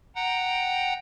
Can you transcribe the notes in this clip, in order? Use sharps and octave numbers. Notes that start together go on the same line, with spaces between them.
F#5 G5 A#5